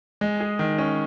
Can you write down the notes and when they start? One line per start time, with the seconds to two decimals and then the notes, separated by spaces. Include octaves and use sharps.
0.21 G#3
0.40 G#4
0.59 D#3
0.78 C#4